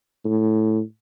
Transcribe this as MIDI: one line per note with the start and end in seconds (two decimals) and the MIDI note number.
0.25 0.81 45